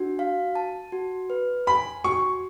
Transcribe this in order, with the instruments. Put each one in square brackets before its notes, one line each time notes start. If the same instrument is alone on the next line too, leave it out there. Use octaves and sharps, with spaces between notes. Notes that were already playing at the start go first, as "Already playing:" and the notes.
Already playing: [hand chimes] D4 F#4
F5
A5
F#4
B4
[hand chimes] G#5 [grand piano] B5
[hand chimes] F#4 [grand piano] C#6